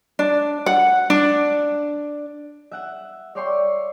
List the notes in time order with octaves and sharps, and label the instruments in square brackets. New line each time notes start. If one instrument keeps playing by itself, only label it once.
[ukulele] D4
F#5
D4
[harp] E5 F#5 E7
C#5 D5 E5 G5 C6 C#6